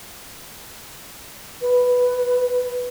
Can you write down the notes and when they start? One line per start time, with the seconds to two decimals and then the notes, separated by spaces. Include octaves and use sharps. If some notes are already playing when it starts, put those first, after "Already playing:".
1.62 B4